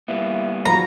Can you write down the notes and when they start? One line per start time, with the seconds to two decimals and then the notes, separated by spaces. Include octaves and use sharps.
0.08 G3 A#3 B3 E4
0.65 G#2 F3 F#3 A#5